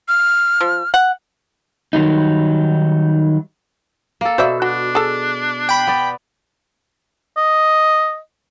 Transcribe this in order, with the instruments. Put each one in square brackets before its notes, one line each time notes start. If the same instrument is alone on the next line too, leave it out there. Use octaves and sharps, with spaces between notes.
[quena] F6
[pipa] F3
F#5
[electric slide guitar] D#3 F#3 G3 D#4
[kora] A#3 A4
[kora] B2 [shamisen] C5 D5 E5
[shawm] D4 [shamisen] F#4
[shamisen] G#4 A4
[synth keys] G5 B5
[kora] B3 D5
[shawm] D#5